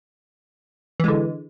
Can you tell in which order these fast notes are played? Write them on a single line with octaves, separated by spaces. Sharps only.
E3 G#3 D3